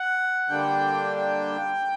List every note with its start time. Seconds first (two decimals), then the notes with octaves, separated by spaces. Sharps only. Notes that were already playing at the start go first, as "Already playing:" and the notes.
Already playing: F#5
0.49 D3 G3 A#3 D4 G5
1.16 G5